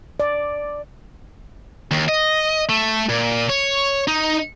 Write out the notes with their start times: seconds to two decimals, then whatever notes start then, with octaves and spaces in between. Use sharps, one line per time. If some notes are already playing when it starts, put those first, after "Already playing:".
0.20 D5
1.91 D#2
2.09 D#5
2.69 A3
3.09 A#2
3.49 C#5
4.08 D#4